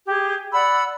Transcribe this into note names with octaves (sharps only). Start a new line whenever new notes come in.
G4 G#4
D5 F#5 B5 E6